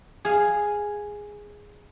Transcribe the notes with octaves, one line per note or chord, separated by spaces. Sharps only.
G#4 F5